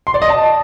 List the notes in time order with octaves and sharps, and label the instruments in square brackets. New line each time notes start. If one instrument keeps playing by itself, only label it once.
[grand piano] C6
D5
D#5
A5